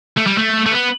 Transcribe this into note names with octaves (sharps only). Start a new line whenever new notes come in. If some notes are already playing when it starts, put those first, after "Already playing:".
A3
G3
A3
A3
B3